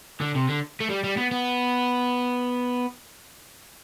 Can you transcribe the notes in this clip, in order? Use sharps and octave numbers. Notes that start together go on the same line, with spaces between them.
D3
C3
D3
A3
G3
G3
B3
B3